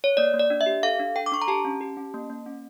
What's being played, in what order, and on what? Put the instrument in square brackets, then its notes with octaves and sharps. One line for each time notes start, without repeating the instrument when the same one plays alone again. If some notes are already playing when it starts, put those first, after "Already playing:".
[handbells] C#5
A#3 D5
A#3
D5
D4
E5
G4
A4 F5
D4
A4 G5
D6
D4 C#6
A#5
G4 A5
C#4
G4
C#4
A#3
A#3
C#4